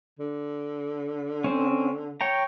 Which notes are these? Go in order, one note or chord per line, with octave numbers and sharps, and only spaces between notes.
D3
C4 C#4
C#5 G5 A#5